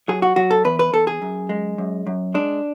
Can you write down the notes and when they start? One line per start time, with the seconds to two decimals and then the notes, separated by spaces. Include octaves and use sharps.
0.08 F#3 G#4
0.22 F#4
0.36 F#3 F#4
0.51 A4
0.64 E2 B4
0.79 B4
0.93 E2 A4
1.07 G#4
1.22 F#2
1.49 G#3
1.78 F#2
2.07 F#2
2.34 G#3 D4